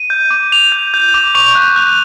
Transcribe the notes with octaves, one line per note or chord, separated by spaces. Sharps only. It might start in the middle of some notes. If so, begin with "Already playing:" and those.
Already playing: D#7
G6
D6
D6 F7
G6
G6
D6
C#6 F7
F#6
F#6